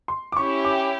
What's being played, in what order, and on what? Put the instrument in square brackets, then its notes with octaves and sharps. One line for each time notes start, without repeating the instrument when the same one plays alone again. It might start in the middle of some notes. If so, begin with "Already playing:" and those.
[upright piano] C6
D6
[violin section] C#4 E4 G4 [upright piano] C#6
[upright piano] D6